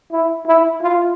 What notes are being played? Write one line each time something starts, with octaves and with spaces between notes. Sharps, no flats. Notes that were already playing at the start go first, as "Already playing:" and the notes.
E4
E4
F4